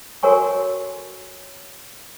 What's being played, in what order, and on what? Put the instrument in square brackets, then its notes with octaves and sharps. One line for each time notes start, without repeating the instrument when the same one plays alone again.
[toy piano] F#4 A4 A#4 C#5 G#5 C#6